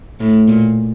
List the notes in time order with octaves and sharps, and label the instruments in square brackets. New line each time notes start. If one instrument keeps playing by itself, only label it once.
[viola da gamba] A2
A#2